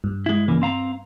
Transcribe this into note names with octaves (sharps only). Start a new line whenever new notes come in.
G2
G#3 E4
C#3 E3 A#3
C4 F5 A#5